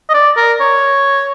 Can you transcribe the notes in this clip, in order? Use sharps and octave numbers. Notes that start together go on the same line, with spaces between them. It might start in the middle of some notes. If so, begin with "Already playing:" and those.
D#5
D5
A#4
C#5